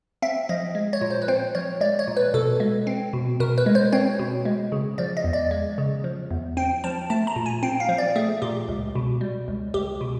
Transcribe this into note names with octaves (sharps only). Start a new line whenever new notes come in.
C4 E5
F3 D#5
G#3
C#5
A#2
C5
B4
C4 C5
F3 C#5
G#3 D5
C#5
A#2
B4
B2 A4
G#3
C4
B2
B2 A#4
B4
G#3
C5
C4 C#5
B2
G#3
C#3
F3 D5
D#5
E2
D5
G#3
C#3
F3
E2
C4 G5
F3 A5
A3 A5
A#5
A#2
G#5
C4 G5
F5
F3
D5
A3 G#4
A#2 G4
C#2
B2
G3
C#2
C#2 G4
B2